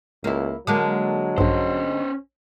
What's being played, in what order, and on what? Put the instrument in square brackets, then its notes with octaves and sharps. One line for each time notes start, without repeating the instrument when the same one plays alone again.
[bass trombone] C#2 [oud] A#3 E4
[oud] D3 G#3 A#3 [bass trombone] F#3 [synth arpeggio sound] D6
[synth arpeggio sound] A#1 G2 [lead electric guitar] C#4 C5